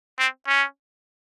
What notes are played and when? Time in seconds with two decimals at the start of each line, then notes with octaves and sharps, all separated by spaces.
0.18 C4
0.47 C#4